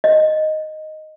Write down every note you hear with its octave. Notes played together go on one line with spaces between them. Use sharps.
D#5